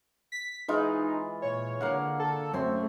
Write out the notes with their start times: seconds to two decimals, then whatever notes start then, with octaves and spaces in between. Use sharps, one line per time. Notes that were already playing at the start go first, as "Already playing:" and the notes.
0.32 B6
0.68 E3 G#3 D#4 F4
1.42 A#2 C#5
1.81 D3 A#3 F5 F#5
2.19 A4
2.53 F#2 A3 C4 C#5 C6